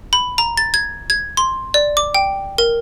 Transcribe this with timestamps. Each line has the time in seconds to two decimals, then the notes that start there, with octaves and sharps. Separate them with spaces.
0.13 B5
0.38 A#5
0.57 A6
0.74 G#6
1.10 G#6
1.37 C6
1.74 D5
1.97 D6
2.14 G5
2.58 A#4